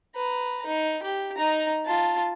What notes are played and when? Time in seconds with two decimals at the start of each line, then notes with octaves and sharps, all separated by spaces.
0.16 B4 A#5
0.66 D#4
1.03 G4
1.37 D#4 A#5
1.85 F4 A5